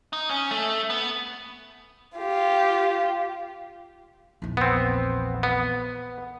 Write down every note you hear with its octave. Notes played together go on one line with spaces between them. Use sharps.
D#4
C#4
A3
B3
F4 G4
A#1 E2
B3 C4
B3